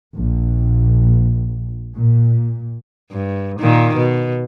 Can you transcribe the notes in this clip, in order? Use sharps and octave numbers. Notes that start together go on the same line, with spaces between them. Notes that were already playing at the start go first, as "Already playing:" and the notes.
A#1
A#2
G2
A#2 D#3
B2